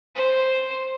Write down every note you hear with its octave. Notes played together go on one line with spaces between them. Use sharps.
C5